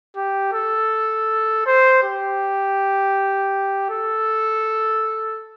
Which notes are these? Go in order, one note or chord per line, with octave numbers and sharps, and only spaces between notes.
G4
A4
C5
G4
A4